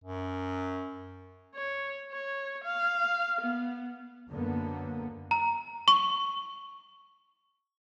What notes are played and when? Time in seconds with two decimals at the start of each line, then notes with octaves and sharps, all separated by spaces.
0.04 F#2
1.55 C#5
2.12 C#5
2.64 F5
3.41 B3
4.29 F#2 D3 A#3 B3
5.31 A#5
5.88 C#6